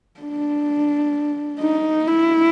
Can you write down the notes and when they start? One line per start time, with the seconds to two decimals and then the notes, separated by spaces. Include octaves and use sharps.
0.20 D4
1.60 D#4
2.07 E4